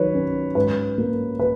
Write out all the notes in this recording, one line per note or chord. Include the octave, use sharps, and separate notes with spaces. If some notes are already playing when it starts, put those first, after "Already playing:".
Already playing: D#3 F#3 B4 C#5
C#4
G#2 B4
A#3
B4